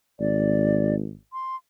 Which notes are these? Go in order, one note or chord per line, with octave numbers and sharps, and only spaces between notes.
G#1 D5
C6